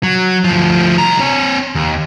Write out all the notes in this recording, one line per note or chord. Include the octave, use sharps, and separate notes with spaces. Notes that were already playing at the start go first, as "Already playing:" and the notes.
F#3
D2 F3
C2 A#5
C4 C#5
D#2